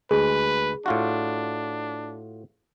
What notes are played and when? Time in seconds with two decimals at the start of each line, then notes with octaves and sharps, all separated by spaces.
0.11 D2 G#3 G#4 B4
0.86 A2 D4 F4 F#4